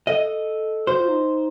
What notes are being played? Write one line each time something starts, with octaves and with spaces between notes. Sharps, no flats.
A4 D#5
F#4 C5
F4
D#4